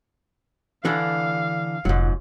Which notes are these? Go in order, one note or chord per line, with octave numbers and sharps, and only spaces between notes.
D3 E3 D4 F5
F1 G#2 F#3 F4